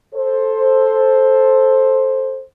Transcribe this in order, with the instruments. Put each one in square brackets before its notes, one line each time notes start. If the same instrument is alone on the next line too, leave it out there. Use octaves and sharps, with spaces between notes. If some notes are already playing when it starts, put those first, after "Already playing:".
[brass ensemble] A4 C5